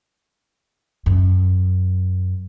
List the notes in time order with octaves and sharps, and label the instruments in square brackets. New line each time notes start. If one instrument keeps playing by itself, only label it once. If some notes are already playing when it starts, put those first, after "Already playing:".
[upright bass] F#2